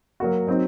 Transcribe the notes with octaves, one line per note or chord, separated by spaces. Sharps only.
F#3 A#3 F#4
F#3 C4 D#4